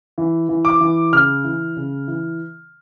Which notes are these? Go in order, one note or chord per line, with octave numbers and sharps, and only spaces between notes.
E3
E3
D6
E3
C#3 F6
E3
C#3
E3